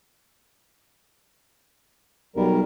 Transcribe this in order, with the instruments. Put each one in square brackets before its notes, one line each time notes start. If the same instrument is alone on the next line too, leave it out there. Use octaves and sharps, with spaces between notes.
[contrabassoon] B1 [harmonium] G3 A#4